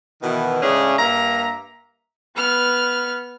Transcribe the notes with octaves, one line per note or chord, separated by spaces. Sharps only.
B2 D#3 E3
A2 C#3 G#3 C#4 D4 G#4
G2 A#3 E5 A#5
B3 F6